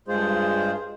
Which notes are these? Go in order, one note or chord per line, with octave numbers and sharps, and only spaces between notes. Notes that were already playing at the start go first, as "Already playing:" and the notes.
G2 G#3 F4 G#4 C5